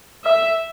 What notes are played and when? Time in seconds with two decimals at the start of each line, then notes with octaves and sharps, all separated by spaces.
0.24 E5